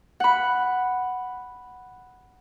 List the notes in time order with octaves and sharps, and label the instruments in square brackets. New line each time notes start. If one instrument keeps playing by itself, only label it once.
[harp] F#5 B5